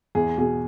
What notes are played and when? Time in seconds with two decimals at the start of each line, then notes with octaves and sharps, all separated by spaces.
0.15 E2 G#4
0.37 B2 G#4